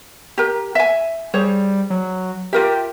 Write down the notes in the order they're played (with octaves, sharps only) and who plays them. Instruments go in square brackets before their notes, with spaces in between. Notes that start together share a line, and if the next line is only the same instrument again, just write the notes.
[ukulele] G4 A#4
E5 G#5
[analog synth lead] G3 [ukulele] G#4 C5 C#5
[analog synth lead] F#3
[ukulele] F4 A#4 E5 [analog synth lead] G4